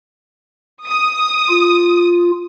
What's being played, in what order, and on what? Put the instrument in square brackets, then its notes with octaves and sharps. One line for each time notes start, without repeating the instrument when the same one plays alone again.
[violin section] D#6
[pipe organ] F4